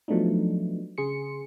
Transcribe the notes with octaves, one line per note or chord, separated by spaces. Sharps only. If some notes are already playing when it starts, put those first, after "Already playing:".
F3 F#3 A3 B3 D4 D#4
C#3 G#4 C6 C#7